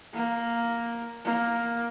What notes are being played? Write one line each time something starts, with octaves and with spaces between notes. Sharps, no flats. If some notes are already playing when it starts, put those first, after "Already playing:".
A#3
A#3